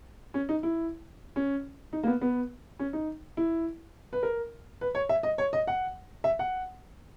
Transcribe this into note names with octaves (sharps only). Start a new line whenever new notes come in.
C#4
D#4
E4
C#4
D#4
A#3
B3
B3
C#4
D#4
E4
B4
A#4
B4
C#5
E5
D#5
C#5
D#5
F#5
E5
F#5